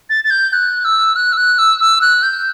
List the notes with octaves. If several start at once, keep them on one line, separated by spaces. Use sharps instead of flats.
A6
A6
G6
F#6
E6
F#6
E6
F#6
E6
E6
F#6
G6